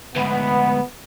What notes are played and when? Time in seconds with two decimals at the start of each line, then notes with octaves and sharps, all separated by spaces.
0.16 D2 G#2 B3